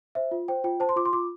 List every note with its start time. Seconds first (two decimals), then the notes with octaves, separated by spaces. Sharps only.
0.15 C5 E5
0.31 F4
0.48 C5 G5
0.64 F4 G5
0.80 C5 A5
0.89 C6
0.96 F4 D6
1.05 C6
1.13 F4 D6